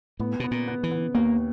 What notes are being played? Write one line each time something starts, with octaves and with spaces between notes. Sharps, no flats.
A2 B3
B2 B3
A#2
B3
E3
B3
D#2 A#3